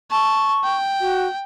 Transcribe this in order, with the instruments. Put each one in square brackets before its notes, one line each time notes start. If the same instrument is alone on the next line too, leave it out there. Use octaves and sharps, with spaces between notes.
[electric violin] A5 [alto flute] C#6
[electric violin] G5
[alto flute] F#4